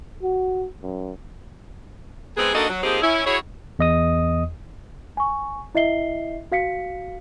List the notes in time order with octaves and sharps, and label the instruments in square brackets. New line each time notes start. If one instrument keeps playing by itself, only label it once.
[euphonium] F#4
F#2
[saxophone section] G#2 G#3 B3 C4 G#4
A#3 D4 D#4 F#4 A4 D#5
F#3
F3 A#3 C4 D#4 G4 G#4
C#4 E4
E4 F#4 G#4 C#5
[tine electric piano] E2 D#5 D#6
[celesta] G#5 C#6
E4 D#5 E5 C7 G7
F#4 F5 B6 C#7